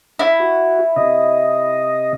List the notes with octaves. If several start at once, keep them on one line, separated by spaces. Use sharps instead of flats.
E4
F#4
C3 D#5